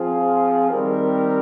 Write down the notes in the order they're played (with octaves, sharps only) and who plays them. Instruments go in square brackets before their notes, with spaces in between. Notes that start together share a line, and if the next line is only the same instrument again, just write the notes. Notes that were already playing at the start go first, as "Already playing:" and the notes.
Already playing: [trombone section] F3 C4 F4 G#4
D#3 G3 C4 G4 A#4